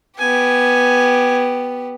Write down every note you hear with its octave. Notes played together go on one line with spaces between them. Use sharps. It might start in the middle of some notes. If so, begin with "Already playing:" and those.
B3 G4 G#5